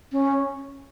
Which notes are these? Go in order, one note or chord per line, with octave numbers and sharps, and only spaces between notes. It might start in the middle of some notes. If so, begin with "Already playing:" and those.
C#4